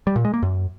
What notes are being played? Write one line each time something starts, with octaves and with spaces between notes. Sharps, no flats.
G3
A#2
G#3
A#3
F#2